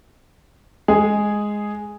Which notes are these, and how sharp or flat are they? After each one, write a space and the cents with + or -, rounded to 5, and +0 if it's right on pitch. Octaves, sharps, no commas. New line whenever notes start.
G#3 +0 G#4 +0